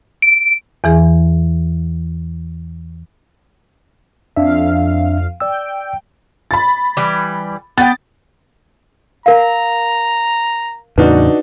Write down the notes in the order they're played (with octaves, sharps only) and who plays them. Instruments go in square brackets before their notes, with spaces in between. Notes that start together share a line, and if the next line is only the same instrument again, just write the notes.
[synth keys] D7
[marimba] E2 E3 G#4
[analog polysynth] F2 F5 [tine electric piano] D4 E5
[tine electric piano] D5 E6 [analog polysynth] G5
[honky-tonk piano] B5 A6
[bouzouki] E3 G3
[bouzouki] B3 G5 [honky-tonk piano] A6
[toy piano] A#4 F5 [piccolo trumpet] A#5
[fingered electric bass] E2 A2 C#3 [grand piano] D4 D#4 F#4 [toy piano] B4